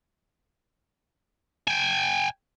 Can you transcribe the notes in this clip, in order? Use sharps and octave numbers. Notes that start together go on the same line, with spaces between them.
G5 G#5